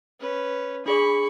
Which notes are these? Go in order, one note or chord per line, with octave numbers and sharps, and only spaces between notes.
C#4 B4
D4 G#4 D5 B5 C#6